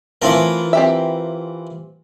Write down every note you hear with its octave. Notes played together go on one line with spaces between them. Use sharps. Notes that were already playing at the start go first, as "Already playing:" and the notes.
E3 A3 C4 E4 F4 A#4
C4 G4 E5